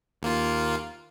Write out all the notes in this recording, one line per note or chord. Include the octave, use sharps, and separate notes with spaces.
D#2 A#3 F4